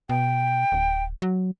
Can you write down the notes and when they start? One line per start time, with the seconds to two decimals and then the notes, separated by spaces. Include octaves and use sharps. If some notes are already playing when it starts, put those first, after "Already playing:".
0.09 B2 G5
0.72 D1
1.22 F#3